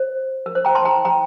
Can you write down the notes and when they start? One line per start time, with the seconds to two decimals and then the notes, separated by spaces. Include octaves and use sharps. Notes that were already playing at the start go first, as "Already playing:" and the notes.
Already playing: C5
0.46 A#4
0.55 C5
0.65 G5 A#5
0.75 A5 C6
0.85 G5 A#5
1.05 G5 A#5